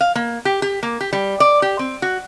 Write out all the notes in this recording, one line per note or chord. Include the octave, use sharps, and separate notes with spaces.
F5
A#3
G4
G4
A#3
G4
G3
D5
G4
C4
F#4